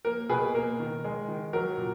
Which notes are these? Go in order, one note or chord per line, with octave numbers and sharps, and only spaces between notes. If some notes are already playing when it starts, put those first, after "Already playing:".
A#3 A#4
B2 G#4 B4
A#3 A#4
D#3
G#3
D#3
F#3 A#4
A#2